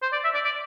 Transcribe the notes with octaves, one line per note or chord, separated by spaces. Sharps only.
C5
D5
E5
D5
D5